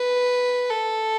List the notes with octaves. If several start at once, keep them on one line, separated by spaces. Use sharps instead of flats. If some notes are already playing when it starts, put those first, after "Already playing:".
Already playing: B4
A4